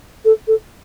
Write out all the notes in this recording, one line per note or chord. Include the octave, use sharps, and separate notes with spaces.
A4
A4